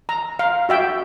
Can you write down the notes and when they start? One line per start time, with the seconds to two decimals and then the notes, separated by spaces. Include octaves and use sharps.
0.09 A#5
0.39 F5
0.69 F#4 E5 G5